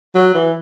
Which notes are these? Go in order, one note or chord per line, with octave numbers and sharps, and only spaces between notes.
F#3
E3